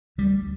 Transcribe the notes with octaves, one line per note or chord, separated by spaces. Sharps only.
D2 G3